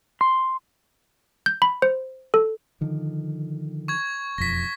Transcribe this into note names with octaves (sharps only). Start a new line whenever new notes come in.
C6
G6
B5
C5
A4
D3 D#3 F3
C#6 G#6
E1 F2 A#6 B6